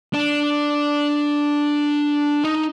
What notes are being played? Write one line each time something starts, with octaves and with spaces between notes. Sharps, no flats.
D4
D#4